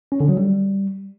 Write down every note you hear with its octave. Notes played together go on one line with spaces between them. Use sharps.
C#4
D3
F#3
G3